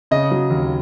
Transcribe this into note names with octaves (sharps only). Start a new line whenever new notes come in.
C#3 D#5
F#3
D#2